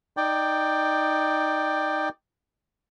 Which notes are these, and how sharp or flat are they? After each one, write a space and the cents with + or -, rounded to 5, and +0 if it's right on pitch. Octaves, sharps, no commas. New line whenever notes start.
D#4 +0 D5 +15 G5 +0